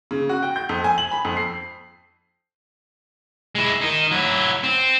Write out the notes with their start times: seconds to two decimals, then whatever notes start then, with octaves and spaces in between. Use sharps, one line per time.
0.11 C#3
0.29 F#4
0.43 G5
0.56 G6
0.69 F2
0.84 G#5
0.98 F#7
1.11 B5
1.25 F2
1.37 C7
3.55 G#3 E4
3.81 D#3 D#4
4.11 F#3 E4
4.64 C4